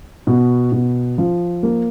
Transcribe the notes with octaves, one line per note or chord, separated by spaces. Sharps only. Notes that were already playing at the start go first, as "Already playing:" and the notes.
B2
B2
F3
A#3